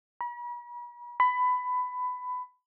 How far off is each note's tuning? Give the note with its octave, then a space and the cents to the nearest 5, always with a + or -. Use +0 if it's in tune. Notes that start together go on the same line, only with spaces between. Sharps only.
B5 -45
B5 +15